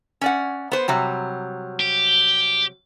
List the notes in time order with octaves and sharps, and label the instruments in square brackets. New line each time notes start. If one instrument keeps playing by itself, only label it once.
[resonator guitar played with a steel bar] C#4 D5 F#5
B3 C5
C3 F#3 G3
[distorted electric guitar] G4